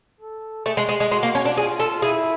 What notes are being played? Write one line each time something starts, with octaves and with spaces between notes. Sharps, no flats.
A4
A3 G#4
G#3
G#3
G#3
G#3 F#4
A#3
C#4
D4
F4 G#4
A4
E4 G#4